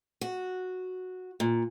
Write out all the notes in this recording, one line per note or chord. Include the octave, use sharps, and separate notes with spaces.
F#4
A#2